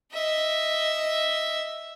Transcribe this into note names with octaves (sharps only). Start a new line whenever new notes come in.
D#5 E5